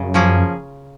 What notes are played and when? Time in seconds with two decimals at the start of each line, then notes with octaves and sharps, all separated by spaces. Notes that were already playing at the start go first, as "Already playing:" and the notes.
Already playing: F#2 C#3
0.14 F3 A#3 C#4 G#4